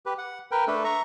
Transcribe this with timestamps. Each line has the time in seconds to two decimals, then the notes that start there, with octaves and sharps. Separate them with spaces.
0.06 G4 B4
0.18 F#5
0.51 A#4 B4 G5
0.68 A3 D4 A4 B4
0.84 E5 A#5 C#6